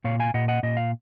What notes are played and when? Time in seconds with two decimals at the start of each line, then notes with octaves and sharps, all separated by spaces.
0.04 A#2 C#5 F5
0.20 F5 G#5
0.34 A#2 D#5 F#5
0.48 D#5 F#5
0.63 A#2 D#5
0.77 F5